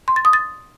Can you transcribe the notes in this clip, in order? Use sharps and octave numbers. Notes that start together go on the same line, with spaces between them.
C6
A6
D#6
A6